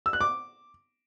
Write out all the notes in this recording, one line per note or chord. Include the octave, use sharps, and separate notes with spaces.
E6
F#6
D6